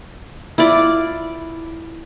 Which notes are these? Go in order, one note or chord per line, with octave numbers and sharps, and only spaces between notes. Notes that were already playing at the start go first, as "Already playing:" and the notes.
E4 F4 D5